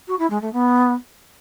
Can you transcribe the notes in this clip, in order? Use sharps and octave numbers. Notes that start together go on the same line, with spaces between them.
F#4
E4
G#3
A3
B3